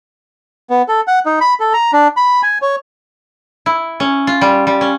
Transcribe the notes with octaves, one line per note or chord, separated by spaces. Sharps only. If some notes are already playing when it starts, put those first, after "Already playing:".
B3
A4
F#5
D#4
B5
A4
A#5
D4
B5
G#5
C#5
E4
C#4
F4
G3
G3
C#4